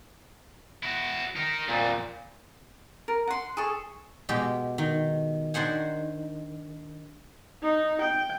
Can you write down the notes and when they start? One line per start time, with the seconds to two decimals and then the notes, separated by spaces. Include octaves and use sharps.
0.83 E4 F#4
1.36 D#4 A#4
1.68 F2 A#2 G3
3.08 A#4
3.27 F#5 C6
3.57 G#4 A4 C#6
4.29 B2 G#3 G4
4.78 D#3
5.54 D#3 D4 C5 F#5 G#5
7.63 D#4
8.01 G5